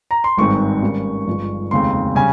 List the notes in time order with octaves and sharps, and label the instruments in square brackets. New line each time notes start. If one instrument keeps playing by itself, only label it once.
[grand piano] A#5
C6
G#1 G2 D#3 G#3 C4 C#6
G#2 D#3 G3 A#3 C#4
G1 G2 F3 G#3
F1 D#2 C#3 G#3 C4 C6
C#3 G3 C#4 G#5